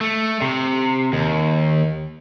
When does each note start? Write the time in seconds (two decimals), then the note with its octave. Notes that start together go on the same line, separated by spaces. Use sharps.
0.01 A3
0.41 C3
1.13 D#2